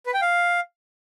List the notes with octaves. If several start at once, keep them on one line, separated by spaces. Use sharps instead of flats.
B4
G5
F5